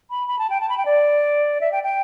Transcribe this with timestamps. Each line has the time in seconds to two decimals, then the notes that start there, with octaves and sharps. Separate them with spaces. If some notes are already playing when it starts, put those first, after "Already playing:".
0.10 B5
0.27 B5
0.38 A5
0.49 G5
0.60 A5
0.69 B5
0.77 G5
0.85 D5
1.60 E5
1.72 G5
1.83 G5